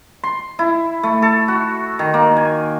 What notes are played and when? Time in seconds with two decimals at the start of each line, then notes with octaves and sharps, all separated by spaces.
0.24 C6
0.59 E4
1.03 A3
1.22 A4
1.48 F#4
1.99 D#3
2.14 A#3
2.37 G#5